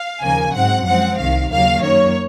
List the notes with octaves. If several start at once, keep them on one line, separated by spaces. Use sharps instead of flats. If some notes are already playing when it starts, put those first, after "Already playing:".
Already playing: F5
D#2 C#3 F3 A#3 G#5
G#2 F#3 C4 F#5
F#2 F3 G#3 C4 F#5
C2 C3 D#3 F5
D#2 C#3 F#3 A#3 F5
F#2 D#3 A#3 C#5